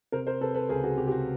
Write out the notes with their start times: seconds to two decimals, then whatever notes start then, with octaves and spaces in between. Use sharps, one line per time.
0.12 C3 A#4 C5
0.27 A#4 C5
0.41 C3 A4 B4
0.55 A4 B4
0.69 C#2 G#4 A#4
0.83 F#4 G#4
0.97 C3 G4
1.07 G4
1.11 F#4